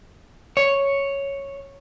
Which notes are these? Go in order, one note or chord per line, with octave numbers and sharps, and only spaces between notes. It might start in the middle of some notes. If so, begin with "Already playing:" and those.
C#5